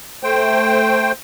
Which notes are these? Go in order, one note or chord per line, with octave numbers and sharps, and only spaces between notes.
A3 C5 G5